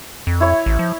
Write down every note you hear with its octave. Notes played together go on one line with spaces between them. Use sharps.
F2
E4 C#5
A1
F3